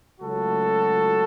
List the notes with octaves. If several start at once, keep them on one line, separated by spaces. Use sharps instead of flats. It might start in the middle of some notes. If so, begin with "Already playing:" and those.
C#2 C#3 F#3 A3 F#4 A4